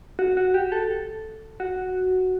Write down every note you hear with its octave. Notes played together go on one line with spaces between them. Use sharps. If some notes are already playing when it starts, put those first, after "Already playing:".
F#4
F#4
G4
A4
F#4